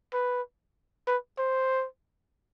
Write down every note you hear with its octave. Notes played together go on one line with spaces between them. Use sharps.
B4
B4
C5